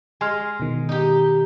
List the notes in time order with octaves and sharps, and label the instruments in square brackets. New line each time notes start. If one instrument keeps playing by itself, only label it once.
[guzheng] G#3 [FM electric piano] G#5 C6 F6
[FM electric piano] B2 D#3
[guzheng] D#4 G4